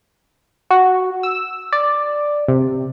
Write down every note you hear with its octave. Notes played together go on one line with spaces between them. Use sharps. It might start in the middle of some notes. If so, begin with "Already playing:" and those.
F#4
E6
D5
C3